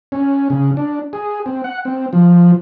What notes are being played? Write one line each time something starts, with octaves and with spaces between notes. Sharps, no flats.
C#4
C#3
D4
G#4
C4
F#5
C4
F3